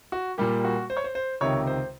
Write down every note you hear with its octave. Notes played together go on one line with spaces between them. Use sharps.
F#4
A#2 G3 A#3 G4
F#4
C5
C#5
C5
C5
C#2 C3 D#3 C#5
C5